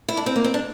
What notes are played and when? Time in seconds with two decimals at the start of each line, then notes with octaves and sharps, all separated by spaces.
0.08 E4
0.17 D4
0.26 C4
0.36 A#3
0.44 C4
0.54 D4